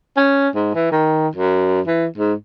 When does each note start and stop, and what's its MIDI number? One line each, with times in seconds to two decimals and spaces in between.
0.16 0.49 61
0.55 0.73 44
0.74 0.90 52
0.91 1.28 51
1.35 1.80 42
1.87 2.06 52
2.17 2.33 44